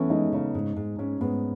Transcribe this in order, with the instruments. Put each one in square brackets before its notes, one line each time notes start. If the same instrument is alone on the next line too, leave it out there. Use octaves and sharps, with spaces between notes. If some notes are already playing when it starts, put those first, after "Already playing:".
Already playing: [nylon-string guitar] E3 [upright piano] A3 B3 C#4
[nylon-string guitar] G#3 [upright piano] D#4
[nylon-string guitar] C#3 [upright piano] D#4
[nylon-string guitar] G#2
G#2
[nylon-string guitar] G#2 [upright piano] C#4
[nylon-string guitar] G#2 [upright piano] B3